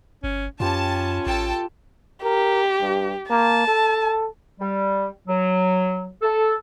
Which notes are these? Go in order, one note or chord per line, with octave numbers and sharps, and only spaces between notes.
G1 C#4
F#2 C#4 F4 G4 B4 A5
A1 A4 G5 A5
G4 A#4
G2
A#3 A5
A4
G3
F#3
A4